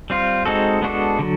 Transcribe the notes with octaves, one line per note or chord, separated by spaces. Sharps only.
G3 C4 F4
G#3 C4 D#4 F#4 A4
G#3 B3 D4 F#4 A4
D3 F#3